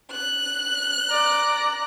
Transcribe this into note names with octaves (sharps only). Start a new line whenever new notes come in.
F#6
D5 A#5